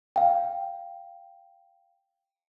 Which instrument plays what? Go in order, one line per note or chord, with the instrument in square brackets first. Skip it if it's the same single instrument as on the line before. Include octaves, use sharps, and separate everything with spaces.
[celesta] F5 G5